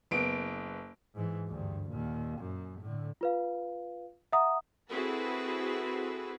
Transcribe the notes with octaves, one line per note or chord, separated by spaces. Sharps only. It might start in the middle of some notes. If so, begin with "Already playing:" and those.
F#1 B3 D7
G#2 E3
D2 G2
D#2 A#2
F#2
A2 D3
F4 B4 F5
E5 F#5 A#5 D#6
C4 E4 F#4 G#4 A4 B4